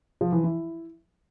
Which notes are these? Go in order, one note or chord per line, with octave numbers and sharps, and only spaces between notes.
F3
E3
E4